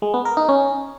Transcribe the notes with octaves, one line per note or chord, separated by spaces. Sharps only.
G#3
B3
A#4
D#4
C#4